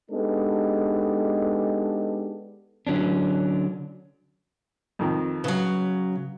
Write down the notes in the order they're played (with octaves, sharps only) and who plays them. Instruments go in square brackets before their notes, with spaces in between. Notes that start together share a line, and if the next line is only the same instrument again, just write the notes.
[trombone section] G#3 B3 D4 D#4 G4 A4
[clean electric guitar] D3 F#3 C#4 D4
[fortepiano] F2 D#3
[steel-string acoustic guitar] C#3 F#3 [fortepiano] B4